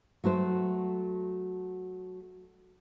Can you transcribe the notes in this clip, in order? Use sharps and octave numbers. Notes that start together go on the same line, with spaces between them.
F#3 A3 F#4 C5